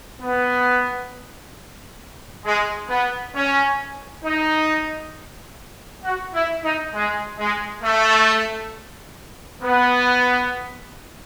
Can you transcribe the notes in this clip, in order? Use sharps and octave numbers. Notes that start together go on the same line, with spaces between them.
B3
G#3
B3
C#4
D#4
F#4
E4
D#4
G#3
G#3
A3
B3